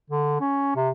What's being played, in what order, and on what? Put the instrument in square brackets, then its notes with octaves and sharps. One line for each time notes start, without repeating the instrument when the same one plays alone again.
[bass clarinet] D3
C#4
C3